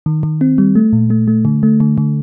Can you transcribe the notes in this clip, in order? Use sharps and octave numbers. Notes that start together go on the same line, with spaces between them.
D#3
D#3
C4
G3
A3
A#2
A3
A3
D3
A3
D3
D3